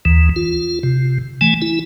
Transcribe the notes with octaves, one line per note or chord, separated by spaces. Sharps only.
D#2 E3
F4
C3
E3 A3 G#5
E4